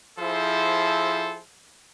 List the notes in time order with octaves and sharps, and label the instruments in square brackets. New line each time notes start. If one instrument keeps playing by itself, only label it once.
[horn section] F3 E4 G#4 A4 C5